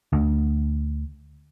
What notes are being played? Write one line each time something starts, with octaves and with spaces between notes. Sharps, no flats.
D2